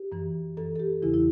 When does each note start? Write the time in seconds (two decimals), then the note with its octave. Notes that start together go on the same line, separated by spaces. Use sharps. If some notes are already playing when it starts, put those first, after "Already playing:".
Already playing: G4
0.12 F#2 E3
0.57 F#2 E3 A4
0.76 A4
0.80 G4
1.03 E2 C#3 E3 E4
1.14 E4